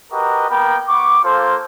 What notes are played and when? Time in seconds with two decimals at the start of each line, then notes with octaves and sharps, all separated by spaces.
0.12 F#4 G4 A#4 B4 D#5
0.49 A#3 B3 A#4 G5 B5
0.89 B3 C#6 D6
1.24 A#3 F4 A4 C5